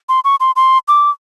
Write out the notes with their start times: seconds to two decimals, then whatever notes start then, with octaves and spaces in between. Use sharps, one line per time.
0.09 C6
0.24 C#6
0.40 C6
0.56 C6
0.88 D6